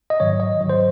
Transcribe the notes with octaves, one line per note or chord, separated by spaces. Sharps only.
D#5
G#2 D#3 F#3 C#5
D#5
G#2 D#3 F#3
C5